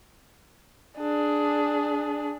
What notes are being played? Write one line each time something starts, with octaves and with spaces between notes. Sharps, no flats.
D4 G#4